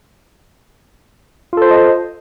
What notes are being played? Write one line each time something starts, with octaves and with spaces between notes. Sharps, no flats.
F4 A4 C5 D#5 A5